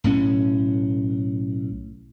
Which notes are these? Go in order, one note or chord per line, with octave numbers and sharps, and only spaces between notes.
B1 A2 C#4